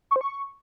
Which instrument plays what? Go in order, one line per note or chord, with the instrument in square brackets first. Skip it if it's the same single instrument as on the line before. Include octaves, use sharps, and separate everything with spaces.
[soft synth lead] C#6
C5
C#6